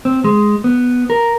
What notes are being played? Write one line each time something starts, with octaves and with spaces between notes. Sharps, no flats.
C4
G#3
B3
A#4